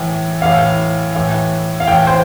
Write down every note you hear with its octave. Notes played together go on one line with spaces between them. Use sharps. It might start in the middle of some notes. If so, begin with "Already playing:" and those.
Already playing: A2 E3
A2 E3 F5
A2 E3
F5
A2 E3 G5
C5